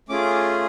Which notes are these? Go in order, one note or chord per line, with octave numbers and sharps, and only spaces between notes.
A3 C#4 F4 G#4 D6